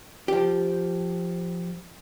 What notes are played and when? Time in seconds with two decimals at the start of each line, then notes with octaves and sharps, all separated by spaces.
0.28 F3 G4